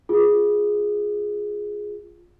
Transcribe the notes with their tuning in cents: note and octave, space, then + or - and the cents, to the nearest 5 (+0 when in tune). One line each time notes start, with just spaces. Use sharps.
F4 +10 G#4 +0